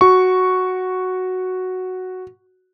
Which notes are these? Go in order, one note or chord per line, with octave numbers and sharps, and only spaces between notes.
F#4 C#6